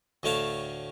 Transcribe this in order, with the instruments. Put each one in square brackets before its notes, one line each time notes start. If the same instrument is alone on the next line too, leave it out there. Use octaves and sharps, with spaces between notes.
[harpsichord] D2 A2 A3 C#5 F5 A5